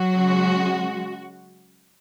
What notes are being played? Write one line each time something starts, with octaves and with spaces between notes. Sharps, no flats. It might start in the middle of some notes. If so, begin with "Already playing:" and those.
Already playing: F#3 F#4
C#3 G#3